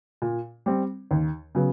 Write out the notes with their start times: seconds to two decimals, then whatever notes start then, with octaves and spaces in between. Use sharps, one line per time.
0.22 A#2
0.66 G3 C4
1.11 D#2
1.55 C#3 F#3 B3